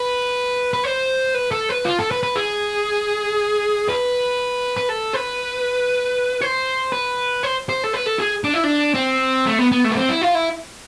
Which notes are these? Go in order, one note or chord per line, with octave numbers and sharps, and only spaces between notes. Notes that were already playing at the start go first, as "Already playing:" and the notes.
Already playing: B4
B4
C5
B4
A4
B4
F4
A4
B4
B4
G#4
B4
B4
A4
B4
C5
B4
C5
C5
A4
B4
A4
G#4
D4
E4
D4
C4
A3
B3
B3
A3
B3
C4
E4
F4
E4